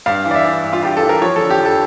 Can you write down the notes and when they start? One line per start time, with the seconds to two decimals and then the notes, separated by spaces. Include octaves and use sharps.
0.06 G2 F5
0.26 E3
0.31 D5
0.36 E5
0.45 E3
0.64 G2
0.73 F4
0.83 G2 G4
0.97 A4
1.02 E3
1.09 A#4
1.22 F3 C#5
1.36 D3 A4
1.50 G4
1.60 F2
1.65 A4